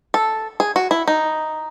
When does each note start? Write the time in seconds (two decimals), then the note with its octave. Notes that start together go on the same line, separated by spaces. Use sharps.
0.14 A4
0.60 G#4
0.76 F#4
0.91 E4
1.08 D#4